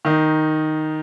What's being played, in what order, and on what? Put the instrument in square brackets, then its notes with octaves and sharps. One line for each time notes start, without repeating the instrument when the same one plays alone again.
[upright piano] D#3 D#4